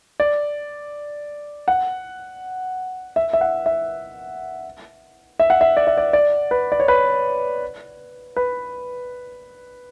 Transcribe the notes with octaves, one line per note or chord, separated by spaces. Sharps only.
D5
F#5
E5
E5
F#5
E5
E5
F#5
E5
D5
E5
D5
D5
B4
D5
C#5
B4
B4